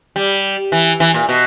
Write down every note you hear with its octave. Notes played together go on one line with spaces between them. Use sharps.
G3
E3
E3
A#2
B2